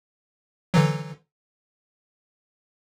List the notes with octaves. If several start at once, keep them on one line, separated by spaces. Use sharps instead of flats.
D3 E3 F#3